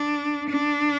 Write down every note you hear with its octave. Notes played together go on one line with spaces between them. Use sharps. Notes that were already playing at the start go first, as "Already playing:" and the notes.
Already playing: D4
D4